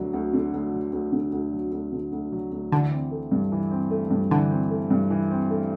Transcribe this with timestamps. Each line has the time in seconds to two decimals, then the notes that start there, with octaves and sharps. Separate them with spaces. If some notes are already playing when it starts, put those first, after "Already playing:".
Already playing: D2 D3 F#3
0.14 D2
0.33 D3
0.54 D2
0.73 F#3
0.93 D2
1.12 D3
1.32 D2
1.52 F#3
1.72 D2
1.92 D3
2.12 D2
2.32 F#3
2.52 D2
2.72 D3 E3
2.92 C4
3.11 A3
3.32 G2
3.52 E3
3.71 C4
3.91 A3
4.11 G2
4.31 D3 E3
4.51 C4
4.70 A3
4.90 G2
5.10 E3
5.30 C4
5.50 A3